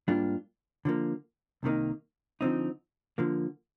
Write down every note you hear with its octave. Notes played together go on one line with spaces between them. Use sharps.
G#2 G3 A#3 D4 F4
D3 F3 A#3
C2 C3 D#3 A#3 D#4
D3 F3 C4 D#4
D3 F3 A#3